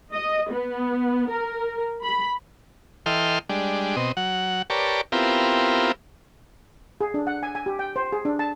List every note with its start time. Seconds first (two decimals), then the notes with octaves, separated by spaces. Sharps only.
0.13 D#5
0.51 B3
1.29 A#4
2.02 B5
3.06 E3 A4 D#5 G5 C6 F6
3.49 G3 G#3 D4
3.96 B2 C4 D#5
4.17 F#3 F#5
4.70 G4 A#4 B4 C#5 D5 A5
5.12 B3 C4 E4 F4 G4 A#4
7.01 G#4
7.14 D4
7.27 F#5
7.43 G#5
7.55 G#5
7.66 G4
7.79 G5
7.96 C5
8.12 G#4
8.25 D4
8.39 A5